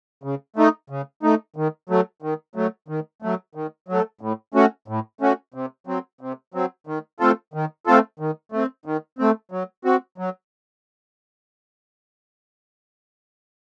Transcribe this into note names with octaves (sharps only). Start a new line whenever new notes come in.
C#3
A3 D#4
C#3
A3 D#4
D#3
F#3 A3
D#3
F#3 A3
D#3
F#3 A3
D#3
F#3 A3
A2
A3 C#4 F#4
A2
A3 C#4 F#4
C3
F#3 C4
C3
F#3 C4
D#3
A3 C4 F4 A4
D#3
A3 C4 F4 A4
D#3
A3 C4
D#3
A3 C4
F#3
C4 F#4
F#3